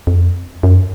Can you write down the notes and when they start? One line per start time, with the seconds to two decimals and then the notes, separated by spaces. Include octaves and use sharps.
0.07 F2
0.63 F#2